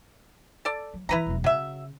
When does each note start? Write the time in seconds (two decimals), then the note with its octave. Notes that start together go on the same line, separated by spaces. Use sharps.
0.65 A4 D5
0.94 F#3
1.09 E3 F#3 E4 B4 A#5
1.26 E1 F#2
1.44 C#3 F#3 E5